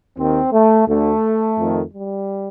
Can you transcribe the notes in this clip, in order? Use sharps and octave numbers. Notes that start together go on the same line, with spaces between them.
D#2 D#3 C4
A3
D2 D3 A3
F2 D#3
G3